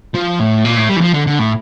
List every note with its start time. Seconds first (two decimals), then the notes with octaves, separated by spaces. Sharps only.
0.14 F3
0.39 A2
0.65 A#2
0.77 A2
0.89 G3
0.96 E3
1.01 F3
1.14 D3
1.27 D3
1.39 A2